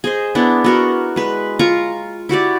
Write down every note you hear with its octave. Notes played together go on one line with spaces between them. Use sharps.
G#4 C5 D#5
B3 D4 E4
B3 F#4 A#4
G#3 B4
F4 A#5 C#6
E4 F#4 G4 D5